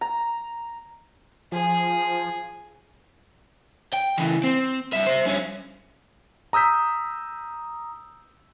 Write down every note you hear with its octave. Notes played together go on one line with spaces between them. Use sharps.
A#5
F3 G#4
G5
C#3 E3
C4
G2 E5
C5 E5
G2 C#4
A#5 D#6 E6 G6 B6